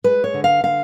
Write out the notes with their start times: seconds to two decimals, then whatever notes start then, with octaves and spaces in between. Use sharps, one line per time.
0.04 G#3 B4
0.24 C#5
0.34 D3
0.44 F5
0.64 D3 F5